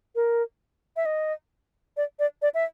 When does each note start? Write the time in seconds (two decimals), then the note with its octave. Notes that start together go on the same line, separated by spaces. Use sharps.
0.15 A#4
0.96 E5
1.06 D#5
1.97 D5
2.19 D5
2.42 D5
2.54 E5